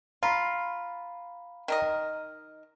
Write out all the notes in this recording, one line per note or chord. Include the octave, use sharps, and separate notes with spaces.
F4 F5 A#5 B5
D#3 A#4 D#5